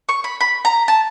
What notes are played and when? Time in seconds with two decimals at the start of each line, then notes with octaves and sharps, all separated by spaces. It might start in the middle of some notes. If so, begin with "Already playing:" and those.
0.09 C#6
0.24 B5
0.40 B5
0.65 A#5
0.88 A5